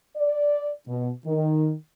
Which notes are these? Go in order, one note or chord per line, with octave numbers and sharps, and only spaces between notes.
D5
B2
D#3